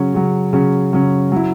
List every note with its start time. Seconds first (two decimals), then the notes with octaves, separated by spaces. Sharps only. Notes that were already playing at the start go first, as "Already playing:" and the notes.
Already playing: C#3 F#3 C#4
0.14 C#3 F#3 C#4
0.53 C#3 F#3 C#4
0.93 C#3 F#3 C#4
1.32 F#3 E4